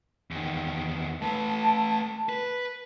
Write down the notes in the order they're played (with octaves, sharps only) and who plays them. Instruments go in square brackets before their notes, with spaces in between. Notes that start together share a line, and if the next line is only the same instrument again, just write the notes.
[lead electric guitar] E2 D#3
[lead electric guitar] A3 B4 [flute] A5
[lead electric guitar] B4